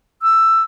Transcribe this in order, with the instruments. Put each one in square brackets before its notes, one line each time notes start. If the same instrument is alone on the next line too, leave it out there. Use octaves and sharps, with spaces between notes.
[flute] E6